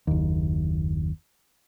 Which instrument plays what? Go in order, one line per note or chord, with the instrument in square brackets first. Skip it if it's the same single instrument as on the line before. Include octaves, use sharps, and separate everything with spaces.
[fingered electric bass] F#1 D#2